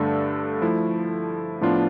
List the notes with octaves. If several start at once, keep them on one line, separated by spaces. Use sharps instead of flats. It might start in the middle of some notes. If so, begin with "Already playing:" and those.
Already playing: G2 D3 A3 D4 A4
F3 A3 E4
A2 F3 B3 D4 F4